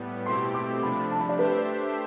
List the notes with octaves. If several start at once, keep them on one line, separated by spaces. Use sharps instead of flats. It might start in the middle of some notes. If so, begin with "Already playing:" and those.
Already playing: A2 G3 B3
B2 A3 C4 E4 G4 C6
D6
C3 F3 A3 D4 B5
A5
B5
D5
A3 D4 G4 B4 C5 E5